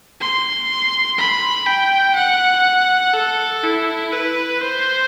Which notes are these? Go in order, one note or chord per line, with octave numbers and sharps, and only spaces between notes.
C6
B5
G5
F#5
A4
E4
B4
C5